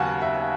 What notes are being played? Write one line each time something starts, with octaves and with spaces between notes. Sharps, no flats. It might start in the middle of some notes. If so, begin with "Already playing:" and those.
Already playing: D#2 C#3 F#3 F#5 G#5 A5
E5